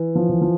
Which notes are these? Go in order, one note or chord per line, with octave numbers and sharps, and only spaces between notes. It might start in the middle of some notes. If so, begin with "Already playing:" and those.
Already playing: E3
F3
E3
F3